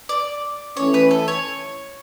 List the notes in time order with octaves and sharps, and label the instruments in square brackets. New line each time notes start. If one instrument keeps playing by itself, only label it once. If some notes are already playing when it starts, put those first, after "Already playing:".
[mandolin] D5
[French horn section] E3 A3 C#4 [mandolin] C#5
[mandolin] B4
A4
C#5